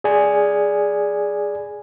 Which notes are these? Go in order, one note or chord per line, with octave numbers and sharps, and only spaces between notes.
G#4 D5 G#5